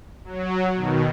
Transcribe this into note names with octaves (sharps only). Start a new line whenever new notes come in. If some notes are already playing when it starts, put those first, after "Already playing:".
F#3
B2 D#3